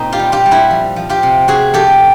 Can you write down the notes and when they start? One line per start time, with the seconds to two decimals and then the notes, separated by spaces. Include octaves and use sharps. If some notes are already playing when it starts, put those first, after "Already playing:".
Already playing: A#2 C4 D#4
0.12 F4 G4
0.19 G3
0.32 F4 G4
0.46 G3
0.51 E4 F#4
0.70 F3
0.96 F3
1.09 F4 G4
1.23 C3
1.48 C3 F#4 G#4
1.74 F3 G4 A4